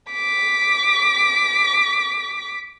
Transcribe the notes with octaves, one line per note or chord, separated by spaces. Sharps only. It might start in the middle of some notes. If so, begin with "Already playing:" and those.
D6 B6